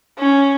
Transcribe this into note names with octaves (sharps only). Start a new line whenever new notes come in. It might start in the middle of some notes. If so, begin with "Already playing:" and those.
C#4